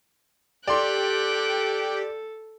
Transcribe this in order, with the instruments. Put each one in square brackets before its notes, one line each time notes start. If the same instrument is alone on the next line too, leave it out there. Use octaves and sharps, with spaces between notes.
[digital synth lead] G4 [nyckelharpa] A4 [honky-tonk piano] D5 C6 [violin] G5 F#6